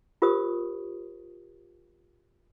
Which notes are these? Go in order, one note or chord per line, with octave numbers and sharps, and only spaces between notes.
F4 G4 A#4 C5 C#6 D#6